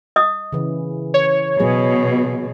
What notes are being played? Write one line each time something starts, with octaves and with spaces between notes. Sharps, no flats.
D#5 D#6
C#3 E3
C#5
B2 F#3 G#4